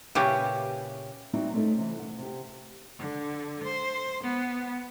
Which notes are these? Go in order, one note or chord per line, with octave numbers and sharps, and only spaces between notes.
A#2 C#3 C#4 E4 G4 B4
G3 B3 C4 D#4 E4 F#4
A3 C4 C#4 D#4 A4
C3 E3
F#5
C3 G4
D3
C5
B3